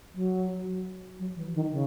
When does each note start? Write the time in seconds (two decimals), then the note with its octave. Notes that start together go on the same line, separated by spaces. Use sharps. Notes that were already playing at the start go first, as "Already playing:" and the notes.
0.15 F#3
1.19 F#3
1.36 E3
1.54 D#3
1.71 C#3